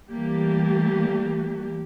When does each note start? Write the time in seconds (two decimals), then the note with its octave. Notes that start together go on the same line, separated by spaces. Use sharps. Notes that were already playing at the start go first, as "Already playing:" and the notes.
0.10 E3 G3 A3 A#3 G4